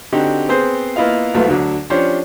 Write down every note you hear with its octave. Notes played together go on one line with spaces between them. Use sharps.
D3 C4 D#4 F#4 G4
B3 C4 G#4 C5
A#3 B3 E4 F4 D#5 F5
C2 F#3 A3 B3 F4 B4
D2 D3 F#3
F3 C#4 D4 G4 C5 C#5